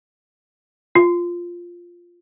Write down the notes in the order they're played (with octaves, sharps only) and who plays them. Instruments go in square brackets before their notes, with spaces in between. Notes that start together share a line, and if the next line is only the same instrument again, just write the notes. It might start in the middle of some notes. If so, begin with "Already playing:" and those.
[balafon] F4